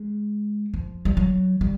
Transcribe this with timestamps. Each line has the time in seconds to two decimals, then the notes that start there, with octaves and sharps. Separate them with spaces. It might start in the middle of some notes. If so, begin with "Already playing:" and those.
Already playing: G#3
0.74 F3
1.05 G3
1.17 F#3
1.61 G3